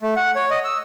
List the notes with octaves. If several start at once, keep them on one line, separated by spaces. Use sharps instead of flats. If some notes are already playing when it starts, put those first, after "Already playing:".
A3
F#5
C#5
D#5
E6